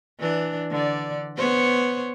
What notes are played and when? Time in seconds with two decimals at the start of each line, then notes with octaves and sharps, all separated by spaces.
0.20 E3 D4
0.71 D3 D5
1.37 B3 C5 C#5